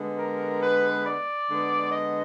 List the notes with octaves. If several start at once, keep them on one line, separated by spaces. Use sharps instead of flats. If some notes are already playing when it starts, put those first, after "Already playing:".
Already playing: D3 G#3 B3
A#4
B4
D5
D3 G#3 B3
D#5